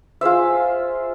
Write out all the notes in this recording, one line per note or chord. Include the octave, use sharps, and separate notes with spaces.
F4 G#4 C5 E5